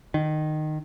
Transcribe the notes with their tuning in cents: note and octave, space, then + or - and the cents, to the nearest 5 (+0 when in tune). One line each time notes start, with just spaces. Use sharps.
D#3 -15